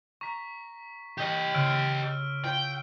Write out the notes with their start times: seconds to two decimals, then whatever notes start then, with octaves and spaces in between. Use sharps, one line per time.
0.21 A#5 C#6 B6
1.18 G4 D#5
1.54 C#3 C6 E6 F6 D7
2.44 F4 G5